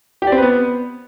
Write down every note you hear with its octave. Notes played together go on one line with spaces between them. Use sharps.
G4
D5
C4
B4
B3